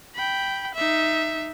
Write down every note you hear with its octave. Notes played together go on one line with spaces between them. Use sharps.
G5 B5
D#4 E5